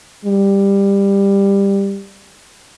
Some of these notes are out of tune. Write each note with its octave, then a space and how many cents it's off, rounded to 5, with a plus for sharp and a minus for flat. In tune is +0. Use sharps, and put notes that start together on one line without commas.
G3 +15